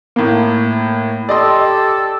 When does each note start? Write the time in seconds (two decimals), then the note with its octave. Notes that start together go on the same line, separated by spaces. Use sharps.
0.16 A2 A#3
1.29 G4 A4 D5 D#5 C6